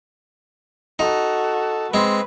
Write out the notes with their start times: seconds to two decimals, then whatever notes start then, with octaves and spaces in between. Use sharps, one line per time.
0.99 D#4 F#4 A4
1.94 G#3 C4 B4